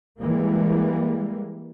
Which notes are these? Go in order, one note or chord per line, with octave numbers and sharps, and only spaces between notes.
E3 G3 G#3 A#3